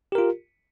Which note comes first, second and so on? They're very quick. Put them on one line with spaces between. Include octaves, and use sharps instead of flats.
G4 A#4 F4